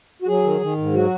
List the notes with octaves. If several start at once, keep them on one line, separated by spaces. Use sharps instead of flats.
F#4
F#3 G#4
D#3
D#3
G#2
F#3 F#4